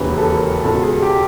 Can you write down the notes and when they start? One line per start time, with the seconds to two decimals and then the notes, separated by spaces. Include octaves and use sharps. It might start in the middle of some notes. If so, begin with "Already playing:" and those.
Already playing: E1 D#2 C#3 E3 B4
0.18 A4
0.25 A#4
0.63 C#2 B2 A4
0.83 G#4
1.02 G4